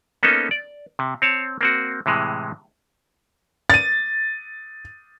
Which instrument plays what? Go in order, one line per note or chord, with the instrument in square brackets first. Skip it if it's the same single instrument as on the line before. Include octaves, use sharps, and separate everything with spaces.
[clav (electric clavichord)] A#3 B3 C#4 D#4 A4
D5
C3
C4 C#5 A5
A#3 C4 F#4
A2 C3 E3 G#3
[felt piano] A6 D#7